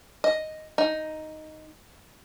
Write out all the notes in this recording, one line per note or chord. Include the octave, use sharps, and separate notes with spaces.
D#5
D#4